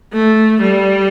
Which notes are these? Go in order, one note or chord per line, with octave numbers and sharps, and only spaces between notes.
A3
G3